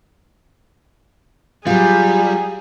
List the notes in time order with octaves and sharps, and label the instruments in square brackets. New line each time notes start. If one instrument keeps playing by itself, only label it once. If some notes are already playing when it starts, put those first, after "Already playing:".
[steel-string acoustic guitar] F#3 F4 [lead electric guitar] G3 [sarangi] G#4